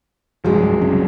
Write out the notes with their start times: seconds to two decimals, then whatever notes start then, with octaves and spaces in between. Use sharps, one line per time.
0.45 C2 G2 F3 F#3 G#3
0.81 F#1 C2 C#4